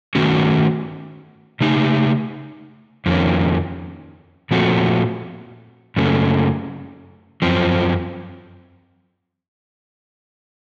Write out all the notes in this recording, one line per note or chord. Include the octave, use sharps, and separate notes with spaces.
D#3 A3 C#4 F#4
C#3 A3 D#4
F2 D#3 A#3 C#4
A#2 F3 A3 C4 F#4
F#2 C#3 A3
F#2 F3 C4